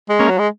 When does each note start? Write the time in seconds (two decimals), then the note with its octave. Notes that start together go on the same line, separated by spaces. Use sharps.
0.10 G#3
0.19 A#3 C#4
0.29 F#3
0.39 G#3